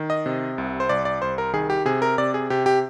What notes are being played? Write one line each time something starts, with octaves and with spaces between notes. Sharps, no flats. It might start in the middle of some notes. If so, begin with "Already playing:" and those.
Already playing: D#3
D#5
C3
C2
C5
C2 D5
D5
C2 C5
A#4
D#3 G#4
G4
C3 G#4
A#4
C3 D5
G#4
C3 G4
G4